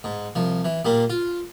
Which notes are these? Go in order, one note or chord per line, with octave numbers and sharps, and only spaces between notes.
G#2
C2 F3
E3
A#2 G3 A#3
F4